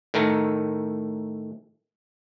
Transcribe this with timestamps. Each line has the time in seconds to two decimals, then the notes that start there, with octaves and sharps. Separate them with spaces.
0.14 A2 D#3 A3 A#4